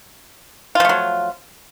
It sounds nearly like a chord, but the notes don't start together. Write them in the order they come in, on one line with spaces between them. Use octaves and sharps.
F4 F3 A3 F#3